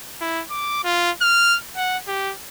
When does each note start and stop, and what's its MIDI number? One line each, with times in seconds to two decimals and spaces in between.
0.21 0.42 64
0.50 0.82 86
0.84 1.11 65
1.21 1.57 89
1.76 1.97 78
2.07 2.33 67